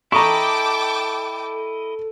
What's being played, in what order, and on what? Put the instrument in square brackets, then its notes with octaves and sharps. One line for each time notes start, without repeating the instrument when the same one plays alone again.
[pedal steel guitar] E4 D#5 [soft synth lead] A4 [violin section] G5 A5 D6 [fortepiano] A#5 C#6